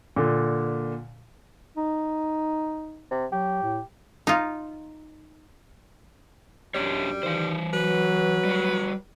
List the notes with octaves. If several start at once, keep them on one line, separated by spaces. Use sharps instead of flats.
A#2 D3
D#4
C3
F#3 G4
A2
D#4 F4
F#2 G3 D4 G4 C#5
D#3 E3 C5
F#3 B4
G3 F#4